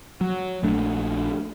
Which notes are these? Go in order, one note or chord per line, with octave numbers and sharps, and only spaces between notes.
F#3
A#1 A3 D4